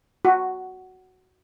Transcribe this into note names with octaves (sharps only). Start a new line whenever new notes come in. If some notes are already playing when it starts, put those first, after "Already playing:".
F#4